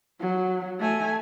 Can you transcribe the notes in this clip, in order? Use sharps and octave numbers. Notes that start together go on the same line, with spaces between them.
F#3
A3 G#5